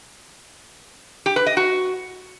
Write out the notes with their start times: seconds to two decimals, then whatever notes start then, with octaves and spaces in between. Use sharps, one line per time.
1.26 G4
1.36 B4
1.46 D#5
1.57 F#4